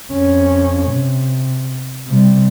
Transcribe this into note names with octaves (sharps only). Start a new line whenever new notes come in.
F2 C#4
C3
C3 G3